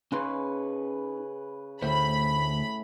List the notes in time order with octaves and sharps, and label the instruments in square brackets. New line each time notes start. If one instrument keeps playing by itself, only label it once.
[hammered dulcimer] C#3 B4 [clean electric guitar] C#4 D#4 C6
[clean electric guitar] D2 C5 [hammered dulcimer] A2 [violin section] B5